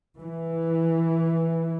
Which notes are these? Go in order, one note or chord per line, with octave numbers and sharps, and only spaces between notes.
E3